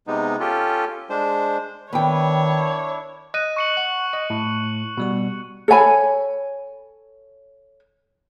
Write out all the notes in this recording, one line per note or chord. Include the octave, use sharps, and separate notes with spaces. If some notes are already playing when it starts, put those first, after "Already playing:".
C3 G#3 B3 D#4
C#4 F4 G4 A4
G#3 D4 C5
D#3 B3 D4 E4 C#5 G5
D#5 F#6 D#7
C#6 C#7 F#7
F#5
D#5
A2
B2 G3 F#4
A4 C#5 G#5 B5